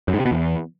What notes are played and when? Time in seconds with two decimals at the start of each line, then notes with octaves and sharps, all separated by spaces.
0.08 F#2
0.14 G#2
0.20 C3
0.26 B2
0.31 E2